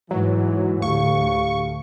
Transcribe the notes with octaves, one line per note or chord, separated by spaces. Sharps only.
G#2 E3 F#3
D2 A2 G4 F5 C#6